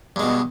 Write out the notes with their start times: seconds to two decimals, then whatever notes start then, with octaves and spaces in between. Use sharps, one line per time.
0.16 G2
0.19 G#3
0.23 B2